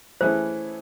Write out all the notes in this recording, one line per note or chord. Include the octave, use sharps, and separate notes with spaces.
E3 A3 C#4 E4 G#4 C5